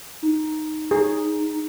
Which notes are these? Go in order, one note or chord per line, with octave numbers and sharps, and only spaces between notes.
D#4
G#4